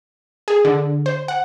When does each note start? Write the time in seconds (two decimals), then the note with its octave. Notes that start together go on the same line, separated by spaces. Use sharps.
0.48 G#4
0.65 D3
1.06 C5
1.28 F#5